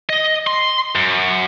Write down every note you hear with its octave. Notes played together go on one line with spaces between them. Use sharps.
D#5
C6
F#2